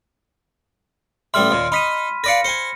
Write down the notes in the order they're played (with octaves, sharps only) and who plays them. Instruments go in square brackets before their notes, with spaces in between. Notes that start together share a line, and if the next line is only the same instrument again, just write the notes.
[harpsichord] A1 G3 E5 [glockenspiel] C6 F6
[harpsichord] D#2 A#2
[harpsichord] D#4 [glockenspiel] B5 B6 D#7
[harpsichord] B4 D5 F5 [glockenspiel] A#6 C#7
[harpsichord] C5 G#5 [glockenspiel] C#7